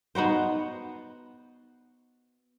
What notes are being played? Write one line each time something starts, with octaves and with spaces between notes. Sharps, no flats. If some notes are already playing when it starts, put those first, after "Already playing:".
B3 D#4 F#4 C5